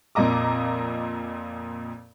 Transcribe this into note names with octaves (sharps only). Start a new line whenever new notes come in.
F2 A#2 A#3 D#5 A#5 D6